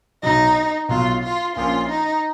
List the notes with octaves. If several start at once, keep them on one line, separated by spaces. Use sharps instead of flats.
B1 B2 F#3 D#4
B1 B2 F#3 F4
F4
A#1 A#2 F3 A#3 C#4 F4
D#4